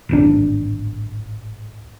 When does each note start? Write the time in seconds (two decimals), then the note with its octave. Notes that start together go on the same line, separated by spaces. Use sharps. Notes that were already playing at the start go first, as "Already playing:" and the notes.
0.09 D1 G#1 D4